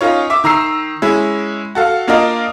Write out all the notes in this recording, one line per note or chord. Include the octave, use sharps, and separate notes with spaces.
C#4 D#4 F4 C#5
E5 D6
D#3 A#5 E6 C7
G#3 C#4 E4
F#4 A4 F5
A#3 D4 F4 A#4 D#5